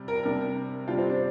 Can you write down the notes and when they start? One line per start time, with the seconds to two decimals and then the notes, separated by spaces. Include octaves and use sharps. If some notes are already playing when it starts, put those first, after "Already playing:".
Already playing: C3 G3
0.08 A#4
0.23 C3 G3 A#4
0.88 C3 G3 F4
0.98 C4
1.10 D4